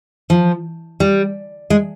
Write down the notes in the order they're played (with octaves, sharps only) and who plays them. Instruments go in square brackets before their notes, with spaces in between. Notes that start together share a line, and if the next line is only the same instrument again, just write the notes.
[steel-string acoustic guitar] F3
G3
G#3